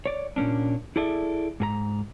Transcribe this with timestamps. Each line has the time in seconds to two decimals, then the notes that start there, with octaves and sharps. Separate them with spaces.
0.06 C#5 D5
0.36 A#2 A#3 C#4 D4
0.96 E4 G#4 A4 D5 E5
1.60 G#2 G#4 A#5